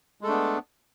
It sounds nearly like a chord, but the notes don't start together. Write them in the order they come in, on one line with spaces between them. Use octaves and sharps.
G#3 A4 A3 D4 B3